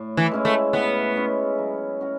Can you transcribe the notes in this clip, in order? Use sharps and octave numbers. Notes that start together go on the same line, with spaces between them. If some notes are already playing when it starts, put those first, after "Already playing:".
Already playing: A2
E3
G#3 C#4 E4
A3
A2 B3
G#3 C#4 E4
F#3
C#4 F#4